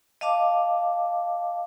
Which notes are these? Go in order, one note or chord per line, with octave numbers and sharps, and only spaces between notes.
D#5 F5 A5 D6